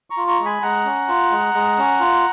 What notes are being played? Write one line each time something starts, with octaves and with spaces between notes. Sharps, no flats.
A#5 C#6
F4
A#5 C#6
G#3
G#5 B5
G#3 F#5 A#5
C#4
F4
G#3
G#3
C#4
F4